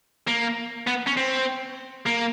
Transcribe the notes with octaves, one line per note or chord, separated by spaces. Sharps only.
A#3
B3
C#4
C4
A#3